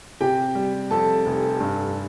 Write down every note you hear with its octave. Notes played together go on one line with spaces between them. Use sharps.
C3 G4 G5
G3
F2 A4 A5
F1
G2